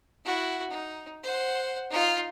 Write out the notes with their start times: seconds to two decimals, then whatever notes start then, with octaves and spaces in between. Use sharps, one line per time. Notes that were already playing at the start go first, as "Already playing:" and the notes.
0.25 E4 F#4
0.70 D#4
1.23 C5 F#5
1.90 D#4 F4